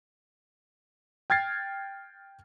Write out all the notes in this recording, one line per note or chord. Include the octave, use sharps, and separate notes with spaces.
G5 F6 G#6 A6 C7